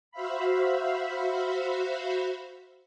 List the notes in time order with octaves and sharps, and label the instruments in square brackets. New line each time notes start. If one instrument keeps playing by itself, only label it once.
[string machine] F#4 C5 E5 F5 B5